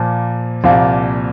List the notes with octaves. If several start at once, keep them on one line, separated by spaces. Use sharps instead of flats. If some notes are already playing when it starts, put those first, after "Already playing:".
Already playing: A#2 F3 A#3
C2 A#2 F3 A#3